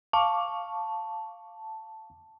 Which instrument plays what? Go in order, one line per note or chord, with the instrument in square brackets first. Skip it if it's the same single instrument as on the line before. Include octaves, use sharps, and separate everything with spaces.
[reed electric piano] F5 C#6 D6 [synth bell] A5